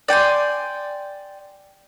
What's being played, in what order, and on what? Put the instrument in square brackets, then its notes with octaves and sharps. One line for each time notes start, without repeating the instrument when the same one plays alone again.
[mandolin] D5 G5 G#5 C6